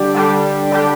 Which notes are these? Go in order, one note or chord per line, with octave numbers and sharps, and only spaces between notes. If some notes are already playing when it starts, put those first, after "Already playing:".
Already playing: D3 G3 D4 G4
D3 G3 D4 G4
D3 G3 D4 G4